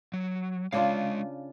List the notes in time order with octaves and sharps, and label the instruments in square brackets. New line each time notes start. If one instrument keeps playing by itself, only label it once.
[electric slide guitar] F#3
[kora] C#3 D4 F4 [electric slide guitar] G#3 F5